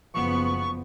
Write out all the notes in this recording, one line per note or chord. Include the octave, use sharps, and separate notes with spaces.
F#1 F3 B3 C#6